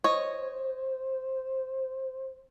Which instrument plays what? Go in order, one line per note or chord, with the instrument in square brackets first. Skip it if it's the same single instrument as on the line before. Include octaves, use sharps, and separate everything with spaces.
[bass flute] C5 [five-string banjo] C#5 D#5